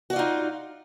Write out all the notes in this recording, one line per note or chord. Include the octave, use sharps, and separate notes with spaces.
D#4 F4 F#4 D5